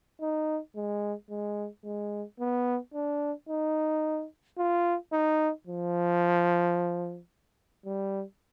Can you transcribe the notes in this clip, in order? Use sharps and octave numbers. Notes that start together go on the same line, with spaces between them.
D#4
G#3
G#3
G#3
B3
D4
D#4
F4
D#4
F3
G3